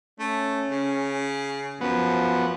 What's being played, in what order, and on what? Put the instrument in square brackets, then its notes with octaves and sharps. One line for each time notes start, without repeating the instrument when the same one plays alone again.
[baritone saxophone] A3 [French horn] C#4
[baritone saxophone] C#3
[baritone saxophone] F#2 [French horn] F3 [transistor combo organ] B3